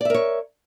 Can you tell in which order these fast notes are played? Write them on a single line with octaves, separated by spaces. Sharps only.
D5 E5 A#4 C#5